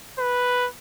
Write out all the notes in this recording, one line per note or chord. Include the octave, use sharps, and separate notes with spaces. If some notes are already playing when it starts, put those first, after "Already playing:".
B4